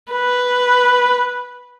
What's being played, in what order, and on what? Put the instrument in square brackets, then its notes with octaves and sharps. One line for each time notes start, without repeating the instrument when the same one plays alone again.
[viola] B4